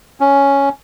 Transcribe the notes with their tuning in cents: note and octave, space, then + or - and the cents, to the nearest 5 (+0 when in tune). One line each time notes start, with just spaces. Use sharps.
C#4 +5